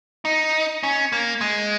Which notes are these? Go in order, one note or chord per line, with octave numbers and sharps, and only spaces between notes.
D#4
C#4
A#3
G#3